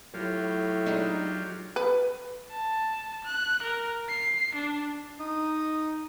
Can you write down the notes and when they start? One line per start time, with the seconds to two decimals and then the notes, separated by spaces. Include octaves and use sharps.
0.14 A2 F#3 F4 G4
0.86 G#3 D4 D#4
1.76 B4
2.51 A5
3.25 F#6
3.63 A#4
4.09 C7
4.55 D4
5.20 D#4 D#6